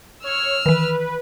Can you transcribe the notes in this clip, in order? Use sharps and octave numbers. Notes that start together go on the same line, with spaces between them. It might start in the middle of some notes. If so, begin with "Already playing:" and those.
C#5 E6 F6
D#3 E3 B4